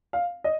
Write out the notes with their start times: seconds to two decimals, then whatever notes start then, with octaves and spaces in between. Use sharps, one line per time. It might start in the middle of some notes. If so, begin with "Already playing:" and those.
0.13 F5
0.44 D#5